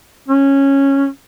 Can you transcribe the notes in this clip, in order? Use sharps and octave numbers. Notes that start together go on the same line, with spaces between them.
C#4